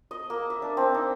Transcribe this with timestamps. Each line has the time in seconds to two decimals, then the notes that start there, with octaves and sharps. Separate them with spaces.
0.11 D#5
0.30 A#3
0.50 E5
0.62 D4
0.77 C4
0.95 D#4